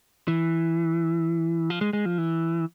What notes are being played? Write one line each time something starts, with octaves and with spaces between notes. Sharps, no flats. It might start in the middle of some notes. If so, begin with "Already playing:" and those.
E3
F3
G#3
G#3
F3
E3